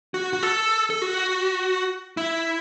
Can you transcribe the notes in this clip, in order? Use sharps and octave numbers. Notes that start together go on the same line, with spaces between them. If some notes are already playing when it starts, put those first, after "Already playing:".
F#4
F#4
A4
A4
F#4
E4